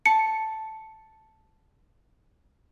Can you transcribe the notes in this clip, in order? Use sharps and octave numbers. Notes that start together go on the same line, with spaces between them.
A5 C#7